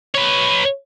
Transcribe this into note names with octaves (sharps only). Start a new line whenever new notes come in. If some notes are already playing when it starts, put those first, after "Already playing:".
B4 C#5